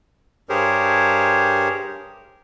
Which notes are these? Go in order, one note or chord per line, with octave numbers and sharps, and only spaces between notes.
G2 G4 G#4 A#4 C5 C#5